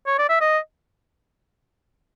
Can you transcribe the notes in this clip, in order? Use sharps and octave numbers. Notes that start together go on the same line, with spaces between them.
C#5
D5
E5
D#5